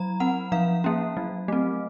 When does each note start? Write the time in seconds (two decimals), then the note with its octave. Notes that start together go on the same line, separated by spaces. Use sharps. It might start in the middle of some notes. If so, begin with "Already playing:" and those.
Already playing: F#3 A#5
0.20 C4 F#5
0.52 F3 F5
0.84 A#3 C#4
1.17 F#3
1.48 A3 C4